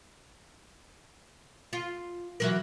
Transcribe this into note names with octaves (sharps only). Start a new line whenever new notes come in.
F4
E3 F#3 A#4